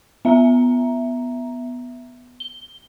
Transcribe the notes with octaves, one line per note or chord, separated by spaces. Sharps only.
B3 E5 A#5
G7